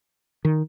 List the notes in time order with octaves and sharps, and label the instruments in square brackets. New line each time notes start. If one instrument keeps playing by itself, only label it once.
[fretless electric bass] D#3